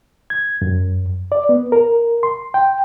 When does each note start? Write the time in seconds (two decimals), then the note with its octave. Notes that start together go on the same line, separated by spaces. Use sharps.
0.30 G#6
0.62 F#2
1.32 D5
1.49 B3
1.72 A#4
2.23 C6
2.54 G5